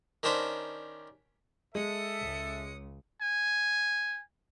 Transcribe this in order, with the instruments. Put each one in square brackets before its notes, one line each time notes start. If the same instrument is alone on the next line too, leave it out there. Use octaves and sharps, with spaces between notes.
[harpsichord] D#3 C#4 D4 C5 A#5 B5
[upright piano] G#3 [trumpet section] A4 E5 [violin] D#6 C#7
[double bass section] C#2
[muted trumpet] G#5